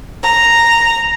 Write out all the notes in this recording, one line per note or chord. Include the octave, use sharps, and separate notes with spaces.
A#5